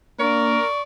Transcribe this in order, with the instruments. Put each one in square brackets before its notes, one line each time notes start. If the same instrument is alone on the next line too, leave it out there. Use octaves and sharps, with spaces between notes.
[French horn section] A#3 D4 [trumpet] A#4 [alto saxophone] D5 [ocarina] C#6